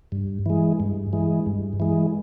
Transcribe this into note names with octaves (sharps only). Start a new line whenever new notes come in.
G2
E3 G#3
G2
E3 G#3
G2
E3 G#3